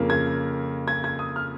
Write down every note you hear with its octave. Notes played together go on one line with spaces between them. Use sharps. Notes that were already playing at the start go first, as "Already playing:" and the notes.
Already playing: F2 C#3 A#3
G#6
G#6
G#6
D#6
F6